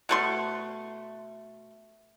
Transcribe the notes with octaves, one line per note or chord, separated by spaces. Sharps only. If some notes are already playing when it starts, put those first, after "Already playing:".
B2 A3 C6